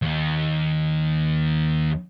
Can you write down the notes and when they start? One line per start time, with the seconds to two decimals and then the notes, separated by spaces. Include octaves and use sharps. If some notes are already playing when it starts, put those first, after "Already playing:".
0.02 D#2 D#3